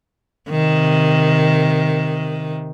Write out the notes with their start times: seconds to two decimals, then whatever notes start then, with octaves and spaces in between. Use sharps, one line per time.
0.49 C3 D#3